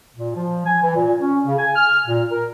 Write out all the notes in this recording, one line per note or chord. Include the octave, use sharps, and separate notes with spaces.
A#2
F3
G#5
E3
A#2
C#4
C#3
G#5
F6
A#2
A#4